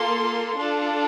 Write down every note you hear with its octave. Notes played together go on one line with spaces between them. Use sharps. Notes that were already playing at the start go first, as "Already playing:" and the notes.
Already playing: A#3 F4 A4 C6
D4 F4 A4